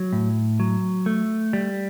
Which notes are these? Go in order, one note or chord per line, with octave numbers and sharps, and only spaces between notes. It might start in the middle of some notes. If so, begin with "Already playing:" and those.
Already playing: F#3
A2
F#3
A3
G3